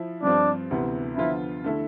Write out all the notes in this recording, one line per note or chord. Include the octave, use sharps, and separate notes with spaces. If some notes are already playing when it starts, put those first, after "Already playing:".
Already playing: F3 E4
G2 F3 C4 D4 F4
D2 C3 E3 B3
D3 F3 B3 E4 F4
D3 A3 E4